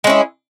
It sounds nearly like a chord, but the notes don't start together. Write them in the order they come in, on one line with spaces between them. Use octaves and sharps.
G#3 C#4 E4